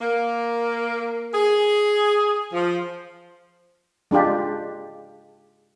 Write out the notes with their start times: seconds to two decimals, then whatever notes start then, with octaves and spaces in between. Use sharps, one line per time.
0.01 A#3
1.34 G#4
2.53 F3
4.11 G#3 D4 F4 G4